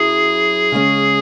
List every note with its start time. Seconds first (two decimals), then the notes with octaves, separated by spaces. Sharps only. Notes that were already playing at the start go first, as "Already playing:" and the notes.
Already playing: F#2 F#3 E4 G#4
0.72 C#3 G#3 C#4